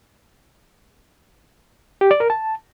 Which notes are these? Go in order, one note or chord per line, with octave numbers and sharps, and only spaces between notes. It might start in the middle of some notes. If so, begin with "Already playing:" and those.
G4
D5
A#4
A5